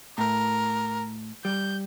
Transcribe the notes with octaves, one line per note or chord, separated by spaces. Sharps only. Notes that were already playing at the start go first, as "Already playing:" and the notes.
A2 A#4
G3 G6